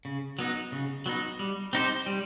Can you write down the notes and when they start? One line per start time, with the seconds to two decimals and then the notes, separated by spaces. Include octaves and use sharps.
0.05 C#3
0.39 F#3 B3 D#4
0.72 C#3
1.06 F#3 B3 D#4
1.39 G3
1.73 C4 D#4 G4 C5
2.06 G3